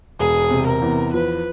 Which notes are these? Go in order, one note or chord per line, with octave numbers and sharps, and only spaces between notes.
E1 G#4
C3
A#4
E2
F3 B4